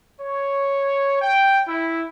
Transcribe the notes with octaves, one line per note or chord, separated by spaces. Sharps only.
C#5
G5
E4